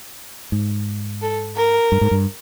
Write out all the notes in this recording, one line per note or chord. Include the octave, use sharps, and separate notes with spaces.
G#2
A4
A#4
G2
G#2
G2